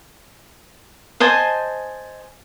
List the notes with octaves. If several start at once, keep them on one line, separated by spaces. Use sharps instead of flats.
C5 D#5 G#5 A5